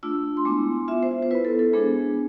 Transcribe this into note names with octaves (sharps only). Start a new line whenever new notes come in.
A3 D4 F4 E6
C6
G#3 B3 E4 D6
B3 F4 E5
C5
C5
B3 E4 B4
A4
A4
G#3 B3 D4 G#4